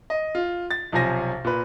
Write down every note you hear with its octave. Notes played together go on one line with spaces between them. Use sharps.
D#5
F4
A6
B1 C3 F3 C5 G#5 A#6
A#2 B4